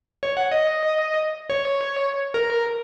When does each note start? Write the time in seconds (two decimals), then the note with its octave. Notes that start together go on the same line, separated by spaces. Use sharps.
0.23 C#5
0.37 F#5
0.52 D#5
1.50 C#5
2.34 A#4